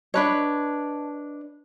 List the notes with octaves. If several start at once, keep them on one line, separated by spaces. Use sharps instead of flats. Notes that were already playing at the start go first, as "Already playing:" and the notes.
D4 B4 C#5 D#5 A5